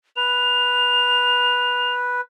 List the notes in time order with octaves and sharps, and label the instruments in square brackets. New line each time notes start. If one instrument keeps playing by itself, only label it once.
[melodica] B4 [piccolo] F7